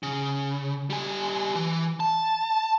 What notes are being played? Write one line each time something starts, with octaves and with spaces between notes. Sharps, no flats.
C#3
G3 G#5
E3
A5